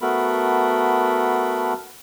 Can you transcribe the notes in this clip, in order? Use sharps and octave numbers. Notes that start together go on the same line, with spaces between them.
A3 B3 F#4 A4 A#4 B5